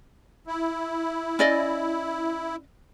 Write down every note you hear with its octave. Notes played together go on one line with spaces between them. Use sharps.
E4
C#4 D5 D#5